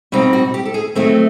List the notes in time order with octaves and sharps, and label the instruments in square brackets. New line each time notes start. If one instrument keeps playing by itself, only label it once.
[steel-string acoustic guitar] B2 G3 C4 D#4 F4
F#4
G4
A4
G#4
D#3 F#3 A3 C4 G#4